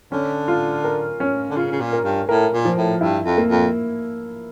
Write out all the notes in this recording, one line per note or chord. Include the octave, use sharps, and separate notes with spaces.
D3 C#4
F4
A#4
C#4
D3
C#3 F4
C#3
A#2
A#4
G2
A2 A#4
A#2
F3
A2
G2 E4
F2
A#3
F2